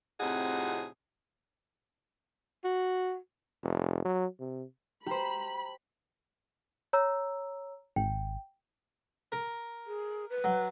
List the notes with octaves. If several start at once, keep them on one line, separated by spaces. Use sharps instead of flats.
F2 A2 C3 D#4 G#4 F#5
F#4
F1
F#3
C3
G4 C5 A#5 B5
C#5 A#5 E6
G#1 G5
A#4
G#4
B4
F#3